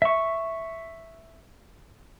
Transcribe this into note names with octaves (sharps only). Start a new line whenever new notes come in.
E5 C#6